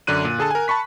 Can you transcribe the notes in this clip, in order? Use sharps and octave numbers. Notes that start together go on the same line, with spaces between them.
F#2 D3 D4 F#6 D#7
A#2
D3 G#4 A4 A5
A#4 G#5
A5 B5 C#6 B6